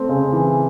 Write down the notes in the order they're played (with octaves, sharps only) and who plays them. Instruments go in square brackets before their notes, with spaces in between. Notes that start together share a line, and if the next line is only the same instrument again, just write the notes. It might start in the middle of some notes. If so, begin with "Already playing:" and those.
Already playing: [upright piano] A3 C4
C#3
E3